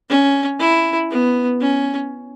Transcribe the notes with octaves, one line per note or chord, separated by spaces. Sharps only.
C#4
E4
B3
C#4